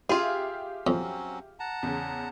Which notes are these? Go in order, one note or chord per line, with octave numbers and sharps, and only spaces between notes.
F4 G4 G#4 E5 F5
F2 F#3 C4 C#4
F#5 A5 A#5
E2 C#3